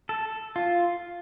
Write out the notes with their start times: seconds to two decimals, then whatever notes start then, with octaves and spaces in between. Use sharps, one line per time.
0.09 A4
0.56 F4